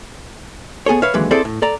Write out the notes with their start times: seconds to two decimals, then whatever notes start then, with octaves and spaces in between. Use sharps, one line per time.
0.86 B3 G#4 A4 C#5
1.02 B4 C#5 E5 F5
1.14 D#2 D3 E3 F#3 G#3 B4
1.31 C4 E4 G#4 A4 C5 D5
1.45 A2
1.62 A4 D5 A#5